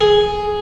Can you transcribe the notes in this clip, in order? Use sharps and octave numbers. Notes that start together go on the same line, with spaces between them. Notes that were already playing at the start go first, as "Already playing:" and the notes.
G#4